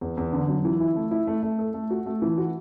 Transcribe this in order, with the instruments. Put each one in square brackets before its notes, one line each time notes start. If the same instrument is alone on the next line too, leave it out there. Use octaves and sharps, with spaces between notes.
[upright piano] E2
E2
D3
F#3
E3
E4
A3
E4
A3
A3
A4
A3
F#4
A3
E3
F#4